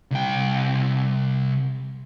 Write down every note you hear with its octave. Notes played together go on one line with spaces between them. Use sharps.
C2 G5